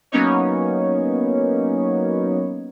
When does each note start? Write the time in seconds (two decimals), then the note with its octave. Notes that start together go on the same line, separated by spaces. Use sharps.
0.12 F#3 A#3 B3 C#4 D#4 C#5